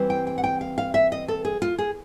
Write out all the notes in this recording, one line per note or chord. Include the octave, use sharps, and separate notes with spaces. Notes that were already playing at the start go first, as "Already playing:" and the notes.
Already playing: E3 G3 C4
G5
G5
F#5
G5
F5
F5
E5
D#5
A4
G#4
F4
G#4